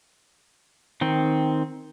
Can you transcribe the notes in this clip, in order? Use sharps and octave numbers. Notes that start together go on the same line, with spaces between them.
D#3 C4